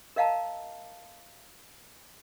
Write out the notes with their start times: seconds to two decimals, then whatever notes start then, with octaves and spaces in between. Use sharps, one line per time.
0.16 A#4 D#5 F5 F#5 A5 A#5